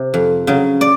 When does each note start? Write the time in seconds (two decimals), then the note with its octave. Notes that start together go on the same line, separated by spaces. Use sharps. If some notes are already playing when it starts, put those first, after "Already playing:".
Already playing: C3
0.14 F2
0.47 C#3 F#3
0.81 D5